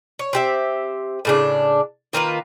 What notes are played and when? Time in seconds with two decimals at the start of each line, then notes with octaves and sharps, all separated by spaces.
0.19 C#5
0.33 C4 G4 E5
1.25 A2 C#3 D4
2.13 D#3 A#3 F4 B4